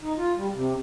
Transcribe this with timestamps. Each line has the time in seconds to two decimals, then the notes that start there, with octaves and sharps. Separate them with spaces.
0.02 D#4
0.18 F4
0.37 G3
0.54 C3